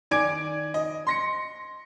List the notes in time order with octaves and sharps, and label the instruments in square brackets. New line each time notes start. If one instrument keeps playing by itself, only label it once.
[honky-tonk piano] D#3 D5 G#5 D6 G#6 D7
D#5
C6 A#6 C#7